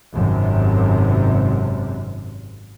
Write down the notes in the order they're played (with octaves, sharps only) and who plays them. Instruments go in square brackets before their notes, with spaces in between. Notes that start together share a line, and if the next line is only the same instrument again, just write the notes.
[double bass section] G#1 F#2 C3